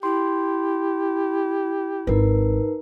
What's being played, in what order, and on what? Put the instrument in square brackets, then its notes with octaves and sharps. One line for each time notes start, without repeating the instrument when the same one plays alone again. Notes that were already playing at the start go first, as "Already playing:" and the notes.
[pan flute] E4 [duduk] G4 [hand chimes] C6
[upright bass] G#1 [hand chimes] D#4 A#4 B4